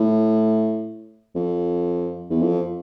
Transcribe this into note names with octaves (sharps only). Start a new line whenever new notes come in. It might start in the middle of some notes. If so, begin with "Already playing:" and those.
Already playing: A2
F2
E2
F2